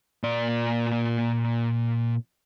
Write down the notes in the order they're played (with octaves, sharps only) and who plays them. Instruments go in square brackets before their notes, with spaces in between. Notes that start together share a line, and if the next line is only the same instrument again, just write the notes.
[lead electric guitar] A#2 D5